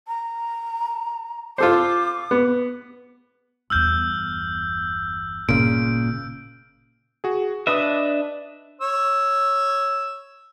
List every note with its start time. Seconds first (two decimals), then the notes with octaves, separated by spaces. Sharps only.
0.08 A#5
1.58 F4 A4 C5 D6
2.31 B3
3.70 G1 E2 E6 F6 G6
5.49 G1 A#2 C#3 D7
7.24 F#4 G#4
7.67 D4 B4 D#5 E5 D#6
8.81 C#5 E6